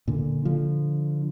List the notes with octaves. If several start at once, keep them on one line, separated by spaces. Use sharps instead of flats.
A#2 D3
D3 F3